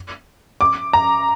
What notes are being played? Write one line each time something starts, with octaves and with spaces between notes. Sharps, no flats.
D6
A#5